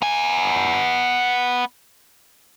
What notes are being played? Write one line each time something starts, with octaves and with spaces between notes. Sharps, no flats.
B3 G#5